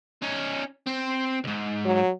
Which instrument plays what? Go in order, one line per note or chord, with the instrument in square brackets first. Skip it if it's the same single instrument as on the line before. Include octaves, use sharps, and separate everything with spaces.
[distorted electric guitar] C#4 D#4
C4
C#2 G#2
[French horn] F#3